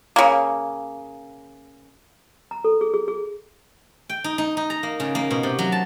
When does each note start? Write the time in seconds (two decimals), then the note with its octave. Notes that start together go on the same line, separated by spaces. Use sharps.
0.16 C#3 A#3
2.51 A#5
2.64 A4
2.81 G#4
2.94 G#4
3.08 G#4
4.09 G5
4.24 D#4
4.38 D#4
4.57 D#4
4.70 A#5
4.83 A#3
5.00 C#3
5.15 A#3
5.31 B2
5.43 C3
5.59 F#3
5.72 A5